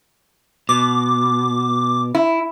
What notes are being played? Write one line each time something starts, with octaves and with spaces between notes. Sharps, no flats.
B2 D6
E4